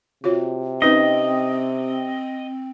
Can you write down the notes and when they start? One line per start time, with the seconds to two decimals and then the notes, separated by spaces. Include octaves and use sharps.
0.24 C3 F4 F#4 C#5
0.82 C4 C#4 D#4 B4 D#5